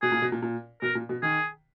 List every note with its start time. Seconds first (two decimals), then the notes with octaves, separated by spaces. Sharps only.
0.02 B2 G#4
0.12 A#2
0.22 B2
0.32 A#2
0.42 A#2
0.82 B2 A#4
0.95 A#2
1.09 B2
1.22 D#3 G#4